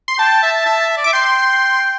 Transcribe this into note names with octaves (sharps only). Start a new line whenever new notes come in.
C6
G5 A5
E5
E5
D5
E5 D6
G5 C6